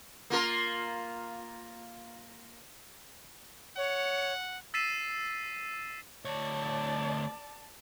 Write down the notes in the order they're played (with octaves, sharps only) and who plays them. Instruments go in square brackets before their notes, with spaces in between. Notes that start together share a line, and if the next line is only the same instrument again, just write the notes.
[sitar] A#3 F4 A#4
[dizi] C#5 [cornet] F#5
[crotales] E6 A6 B6 C7 D#7 E7
[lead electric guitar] D2 C#5 [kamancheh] D5 A5